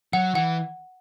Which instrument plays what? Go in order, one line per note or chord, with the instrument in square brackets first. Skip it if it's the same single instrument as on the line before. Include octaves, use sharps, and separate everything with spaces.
[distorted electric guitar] F#3 [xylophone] F#5
[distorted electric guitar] E3 [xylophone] F#5